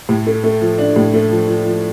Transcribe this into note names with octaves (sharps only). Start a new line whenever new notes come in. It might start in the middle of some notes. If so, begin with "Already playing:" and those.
A2
A3
A3
F3
D4
A2
A3
F3
F3
F3